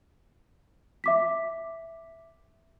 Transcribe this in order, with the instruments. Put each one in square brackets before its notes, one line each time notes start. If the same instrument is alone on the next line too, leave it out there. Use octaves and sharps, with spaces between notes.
[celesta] E5 D6 B6